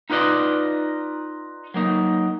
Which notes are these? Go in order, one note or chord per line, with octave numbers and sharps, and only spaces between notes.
D#4 F4 B4 D5 D#5
F#3 A#3 D#4